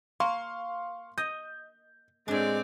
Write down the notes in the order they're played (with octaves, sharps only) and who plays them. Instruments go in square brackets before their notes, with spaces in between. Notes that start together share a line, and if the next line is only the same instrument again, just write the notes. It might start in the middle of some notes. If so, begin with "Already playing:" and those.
[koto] A#3 [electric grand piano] F5 C6 C#6
[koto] D#5 [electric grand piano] G6
[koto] A2 D4 [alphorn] G#3 [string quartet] C4 C#5 D5